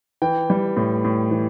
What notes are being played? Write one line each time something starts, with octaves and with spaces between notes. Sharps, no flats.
E3 G5
G3
A2
A2
E3